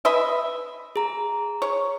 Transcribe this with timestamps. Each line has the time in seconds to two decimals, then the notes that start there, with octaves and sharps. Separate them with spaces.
0.05 B4 D#5 E5
0.96 G#4 A#5
1.62 C#5